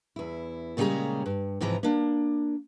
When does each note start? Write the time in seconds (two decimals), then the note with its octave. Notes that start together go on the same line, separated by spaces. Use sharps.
0.16 E2 E4
0.77 A#2 C#3 G3 G#3 C#5 A#5
1.26 G2
1.61 G#2 C3 E3 F3 A#5
1.83 A#3 D4